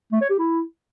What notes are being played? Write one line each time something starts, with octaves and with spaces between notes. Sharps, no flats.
A3
C#5
G4
E4